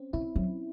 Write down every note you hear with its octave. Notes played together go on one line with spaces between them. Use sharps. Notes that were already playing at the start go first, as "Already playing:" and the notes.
Already playing: C4 C#4
C#3 E4
F#3